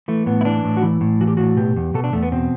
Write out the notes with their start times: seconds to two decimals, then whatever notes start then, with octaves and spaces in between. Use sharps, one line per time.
0.08 E3 A3
0.26 A2 B3
0.41 E4
0.45 E3 D4
0.65 A2
0.77 F#4
0.83 E3 E4
1.01 A2
1.20 E3 F#4
1.28 G4
1.37 A2 F#4
1.57 B2 G4
1.76 E2
1.94 B2 A4
2.04 D4
2.13 E2 A3
2.23 B3
2.32 B2 C4